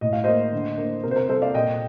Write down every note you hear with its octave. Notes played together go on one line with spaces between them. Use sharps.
A2 D#5
F5
A#3 C5 D#5
D3
A#3
C3 A#4
C5
A#4
G3 A4 C5
D5 F5
A#2 D#5 G5